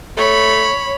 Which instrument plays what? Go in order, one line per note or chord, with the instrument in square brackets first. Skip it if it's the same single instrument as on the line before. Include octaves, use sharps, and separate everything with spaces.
[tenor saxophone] A3 [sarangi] C#5 [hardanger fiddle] B5